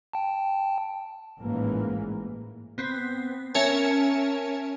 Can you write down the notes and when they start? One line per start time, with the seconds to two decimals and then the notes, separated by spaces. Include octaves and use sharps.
0.13 G5 A5
1.38 A1 G#2 E3 A#3
2.78 B3 C4
3.54 C#4 A#4 C#5 E5 G#5 A5